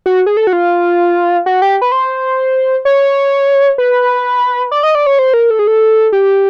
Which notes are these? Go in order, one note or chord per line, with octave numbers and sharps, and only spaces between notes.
F#4
G#4
A4
F#4
F4
F#4
G4
B4
C5
C#5
B4
D5
D#5
D5
C#5
C5
A#4
A4
G#4
A4
G4